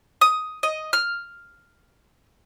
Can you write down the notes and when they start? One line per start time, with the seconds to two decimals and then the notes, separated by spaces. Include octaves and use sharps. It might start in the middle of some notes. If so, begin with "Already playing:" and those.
0.21 D#6
0.63 D#5
0.93 F6